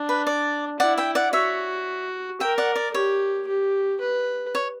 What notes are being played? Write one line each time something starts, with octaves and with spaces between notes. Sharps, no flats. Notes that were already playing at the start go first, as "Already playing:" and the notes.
Already playing: D4
B4
D5
E4 D5 F#5
E5 G5
D5 F#5
F#4 C#5 E5
A#4 E5 G5
D5 F#5
D5
G4 C#5
G4
B4
C#5